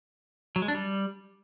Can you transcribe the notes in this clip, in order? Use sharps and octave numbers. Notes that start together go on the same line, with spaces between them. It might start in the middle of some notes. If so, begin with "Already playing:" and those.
F#3
G#3
D4
G3